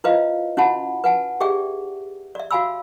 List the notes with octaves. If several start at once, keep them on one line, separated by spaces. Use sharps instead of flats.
E4 F4 B4 C5 D#5 F5
C#4 E4 F#4 F#5 A5 B5
B4 F#5 G#5 A5
G4 G#4 D5 E5 G5
D5 E5
F#4 F5 G#5 B5 E6